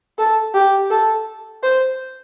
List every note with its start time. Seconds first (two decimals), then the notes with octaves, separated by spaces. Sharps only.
0.18 A4
0.54 G4
0.91 A4
1.63 C5